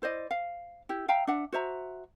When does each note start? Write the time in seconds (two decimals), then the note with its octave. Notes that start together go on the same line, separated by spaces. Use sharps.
0.02 E4 C5 D5 D#5
0.31 F5
0.89 E4 G4
1.08 E5 F5 G5 A#5
1.27 D4 E5 F#5
1.52 F#4 C5 E5 A#5